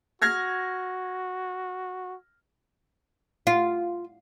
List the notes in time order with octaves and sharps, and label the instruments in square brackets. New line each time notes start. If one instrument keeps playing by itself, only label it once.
[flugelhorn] F#4 [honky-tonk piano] F6 G#6 A#6
[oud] F4